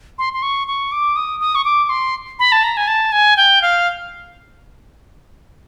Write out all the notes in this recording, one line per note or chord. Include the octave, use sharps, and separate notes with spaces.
C6
C6
C#6
C#6
D6
D#6
D#6
C#6
D6
C6
B5
A5
A#5
G#5
A5
G#5
G5
F5